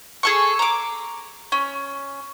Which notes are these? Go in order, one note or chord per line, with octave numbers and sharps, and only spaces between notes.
G#4 A4 C#6
A#5 D6
C#4